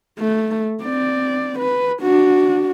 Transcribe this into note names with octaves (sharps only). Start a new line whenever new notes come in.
A3
C4 D5
B4
D4 F#4